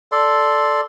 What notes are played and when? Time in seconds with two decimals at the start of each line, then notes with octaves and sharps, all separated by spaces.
0.12 A4 D5 C6